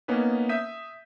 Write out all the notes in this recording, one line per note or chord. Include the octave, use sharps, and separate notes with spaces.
A#3 B3 C#4 D#4 B4
E5 D#6 G6 B6 D#7